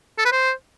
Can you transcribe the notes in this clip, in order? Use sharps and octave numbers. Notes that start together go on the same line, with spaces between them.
A4
B4
C5